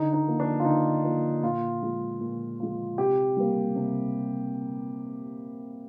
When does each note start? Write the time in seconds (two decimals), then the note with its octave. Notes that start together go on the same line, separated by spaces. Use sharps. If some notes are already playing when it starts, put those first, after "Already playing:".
Already playing: D3 D#4
0.13 D#4
0.27 F3 A#3
0.40 D4
0.60 F4
0.65 D3 D#4
1.04 F3 A#3
1.43 A#2 F4
1.82 F3 G#3
2.21 A#2
2.60 F3 G#3
2.98 C3 G4
3.37 G3 A#3
3.76 C3